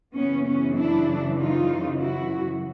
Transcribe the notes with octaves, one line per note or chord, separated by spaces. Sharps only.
F#2 C#3 E3 B3 C#4
B3 C#4
D4 E4
D#4 F4
E4 F#4